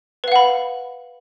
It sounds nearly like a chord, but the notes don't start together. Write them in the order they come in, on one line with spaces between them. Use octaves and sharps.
B4 F5 F#5 B5